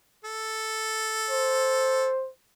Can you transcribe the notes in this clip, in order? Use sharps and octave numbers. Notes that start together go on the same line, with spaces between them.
A4
C5